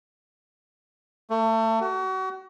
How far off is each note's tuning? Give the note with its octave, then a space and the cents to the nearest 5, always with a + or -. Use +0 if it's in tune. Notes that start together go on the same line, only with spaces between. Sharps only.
A3 +30
F#4 +35